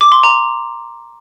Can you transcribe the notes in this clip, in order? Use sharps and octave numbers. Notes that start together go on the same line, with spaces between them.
D6
C6
A#5